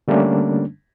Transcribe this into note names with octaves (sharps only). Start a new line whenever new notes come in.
D3 G3 A3 A#3 C#4 D4